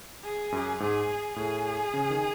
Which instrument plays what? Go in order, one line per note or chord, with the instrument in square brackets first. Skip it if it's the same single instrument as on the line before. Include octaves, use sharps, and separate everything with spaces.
[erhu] G#4
[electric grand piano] F#2
[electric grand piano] G#2 [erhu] G#4
[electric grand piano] A2 [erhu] G#4
[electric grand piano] C#3
D#3